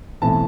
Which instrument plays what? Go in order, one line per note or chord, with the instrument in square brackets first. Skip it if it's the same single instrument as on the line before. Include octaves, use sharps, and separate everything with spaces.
[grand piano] B1 A2 E3 A3 C4 A5